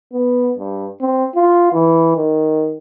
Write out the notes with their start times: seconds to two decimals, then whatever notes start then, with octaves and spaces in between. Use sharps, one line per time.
0.13 B3
0.58 G2
1.01 C4
1.36 F4
1.73 E3
2.16 D#3